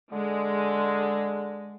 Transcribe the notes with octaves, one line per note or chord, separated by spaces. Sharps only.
D3 G#3